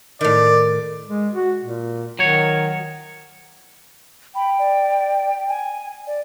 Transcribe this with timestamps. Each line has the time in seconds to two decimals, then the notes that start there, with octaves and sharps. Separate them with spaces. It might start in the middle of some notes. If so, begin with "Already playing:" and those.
0.21 A2 D#3 D5
1.07 G#3
1.33 F#4
1.61 A#2
2.19 D#3 F#3 C#5
4.35 G5 B5
4.59 D5
5.49 G#5
6.07 D5